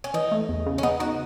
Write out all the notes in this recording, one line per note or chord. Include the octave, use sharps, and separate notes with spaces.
C#4
E3 D#4
A3
E2
C#3
C#4
B3 D#4
D#4 F#4